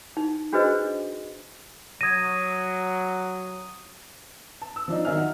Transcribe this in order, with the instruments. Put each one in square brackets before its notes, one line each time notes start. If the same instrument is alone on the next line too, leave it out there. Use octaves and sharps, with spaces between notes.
[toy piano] D#4
D4 F#4 G#4 B4 C5 D#5
[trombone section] F#3 [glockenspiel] D#6 D#7 [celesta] G#6 A#6
[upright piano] A5
E6
F3 D4 D#4
D#3 F#3 D#4 E5 G#5 F6
D#5 F#5